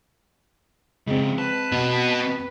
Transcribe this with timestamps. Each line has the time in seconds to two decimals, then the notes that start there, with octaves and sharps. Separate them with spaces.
1.07 C#3 F3 G#3 C4
1.38 B4 A5
1.72 B2